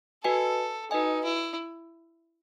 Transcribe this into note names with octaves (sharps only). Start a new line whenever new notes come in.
F#4 A4 B4 D#5 G#5
D#4 F#4 B4 D#5 G#5
E4